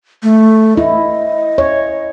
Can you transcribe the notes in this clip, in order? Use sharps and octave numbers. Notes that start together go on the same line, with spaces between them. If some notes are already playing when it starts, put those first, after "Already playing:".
A3
E4 D#5
C#5